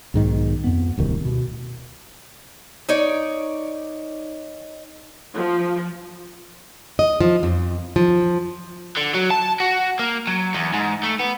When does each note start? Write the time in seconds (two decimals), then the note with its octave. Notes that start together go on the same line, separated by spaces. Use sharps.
0.14 B1 G#2 D#3
0.64 F2 B3
0.97 D1 C2 D#3
1.25 B2
2.89 D#4 C#5 D5
5.36 F3
6.99 D#5
7.21 F3
7.43 F2
7.96 F3
8.97 D3
9.14 F#3
9.31 A5
9.60 F#4
9.99 A#3
10.27 F#3
10.55 E2
10.73 G#2
11.03 A3
11.19 B3